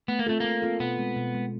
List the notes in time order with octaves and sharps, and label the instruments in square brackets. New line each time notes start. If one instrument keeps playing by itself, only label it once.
[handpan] A3 [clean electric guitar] B3
[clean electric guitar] A#3
[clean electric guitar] A3 [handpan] C4 F4 A4
[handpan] A3 [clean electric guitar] A#3
[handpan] C4 F4 A4
[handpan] B2 [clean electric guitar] B3
[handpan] G#3 C4
B2
G#3 C4